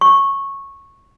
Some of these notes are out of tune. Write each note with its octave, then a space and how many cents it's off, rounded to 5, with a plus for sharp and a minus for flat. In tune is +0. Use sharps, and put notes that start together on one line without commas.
C#6 -15